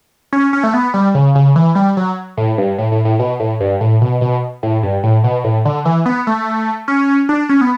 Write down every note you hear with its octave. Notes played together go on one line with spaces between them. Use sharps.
C#4
C#4
A3
B3
G3
C#3
C#3
E3
G3
F#3
A2
G2
A2
A2
A2
B2
A2
G2
A2
B2
B2
A2
G2
A2
B2
A2
D3
E3
B3
A3
C#4
D4
C#4
B3